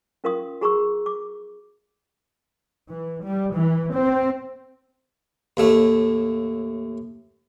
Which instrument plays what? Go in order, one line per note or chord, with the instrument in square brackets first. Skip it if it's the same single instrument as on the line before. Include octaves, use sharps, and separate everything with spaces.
[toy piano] C#4 F4 A#4 F5 C6 D#6
F#4 G#4 A#5 C6 C#6 E6
D6
[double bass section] E3
G3
E3
C4
[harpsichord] D#2 A2 A3